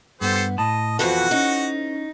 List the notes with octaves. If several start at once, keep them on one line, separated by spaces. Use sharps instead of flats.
G2 B3 G4 A4 C5
A2 D#5 A5 B5
F2 B2 E3 F#4 A4 C5 F#5
C#4 D#4